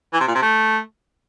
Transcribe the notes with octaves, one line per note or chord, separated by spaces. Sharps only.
E3
C3
A#2
C3
A3